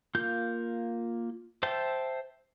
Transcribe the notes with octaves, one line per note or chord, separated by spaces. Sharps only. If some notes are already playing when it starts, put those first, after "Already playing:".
A#3 F4 G6
C5 E5 G5 A5